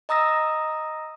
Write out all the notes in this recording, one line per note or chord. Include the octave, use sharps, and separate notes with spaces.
D#5 A#5 D#6 E6 A#6